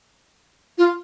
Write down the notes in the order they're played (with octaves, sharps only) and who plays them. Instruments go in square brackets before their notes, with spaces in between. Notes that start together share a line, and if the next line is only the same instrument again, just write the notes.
[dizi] F4